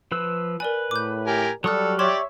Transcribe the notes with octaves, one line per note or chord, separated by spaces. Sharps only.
F3 B4 E6
A#4 B4 D5 G#5
A2 D6 G6
G4 A#4 G#5
F#3 G3 A4 C#6 D#6 F6 F#6
G4 C#5 D5 E5 C6 G#6 E7